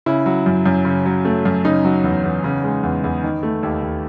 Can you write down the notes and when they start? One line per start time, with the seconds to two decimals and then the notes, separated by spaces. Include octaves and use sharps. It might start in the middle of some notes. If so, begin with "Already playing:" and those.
0.06 C#3 E4
0.26 F#3
0.46 F#2
0.66 F#2
0.85 C#3
1.05 F#3
1.25 A3
1.45 F#2
1.65 C#3 D#4
1.85 F#3
2.04 E2
2.24 E2
2.44 C#3
2.64 G#3
2.83 E2
3.04 E2
3.23 D#3
3.43 A3
3.63 D#2
3.82 D#2